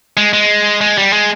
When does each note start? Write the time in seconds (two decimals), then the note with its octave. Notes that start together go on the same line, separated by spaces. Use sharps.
0.17 G#3
0.33 G#3
0.81 G#3
0.98 G3
1.13 G#3